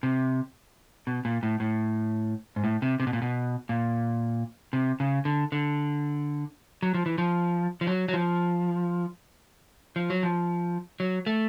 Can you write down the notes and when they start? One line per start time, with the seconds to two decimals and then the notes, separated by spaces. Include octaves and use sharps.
0.03 C3
1.07 B2
1.25 A#2
1.43 A2
1.60 A2
2.56 G#2
2.64 A2
2.82 C3
3.00 C3
3.07 B2
3.13 A#2
3.22 B2
3.69 A#2
4.73 C3
5.00 C#3
5.25 D3
5.52 D3
6.83 F#3
6.94 F3
7.06 E3
7.18 F3
7.81 F3
7.87 F#3
8.08 F#3
8.14 F3
9.96 F3
10.10 F#3
10.23 F3
11.00 F#3
11.27 A3